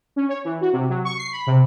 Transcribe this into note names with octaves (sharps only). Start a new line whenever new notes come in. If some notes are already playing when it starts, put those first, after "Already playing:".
C#4
C#5
E3
F#4
C3
F#3
C#6
C7
B5
C3